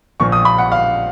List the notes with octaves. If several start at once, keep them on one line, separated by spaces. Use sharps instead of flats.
A#1 A#2 F3 C#6
D#6
B5
F#5
F5